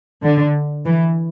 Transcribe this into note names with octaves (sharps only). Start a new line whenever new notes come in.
D3
E3